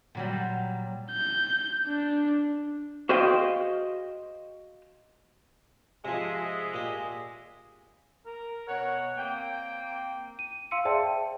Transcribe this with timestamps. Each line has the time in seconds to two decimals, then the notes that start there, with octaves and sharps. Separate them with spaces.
0.15 A#2 F#3 G3
1.12 G6
1.87 D4
3.09 F#4 G#4 C5 D#5 F5 G5
6.05 C3 F3 G#3 G#4 D#5 E5
6.74 A#2 G4
8.26 A#4
8.68 B2 C#5 F#5
9.18 A#3 C4 G5
10.39 D#7
10.71 F5 C6 E6 C#7 D#7
10.85 G#4 C5 D5 E5 G5 A5